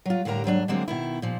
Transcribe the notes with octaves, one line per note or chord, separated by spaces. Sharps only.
F#3 F4
A2 D3 G3 A#4 A#5
D#2 G#2 F#3 D4
D3 F#3 G#3 A#3 C4
B2 D#3 E4
A#2 F3